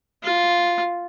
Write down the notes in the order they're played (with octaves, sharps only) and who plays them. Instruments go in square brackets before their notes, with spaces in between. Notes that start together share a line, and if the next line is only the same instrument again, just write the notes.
[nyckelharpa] F4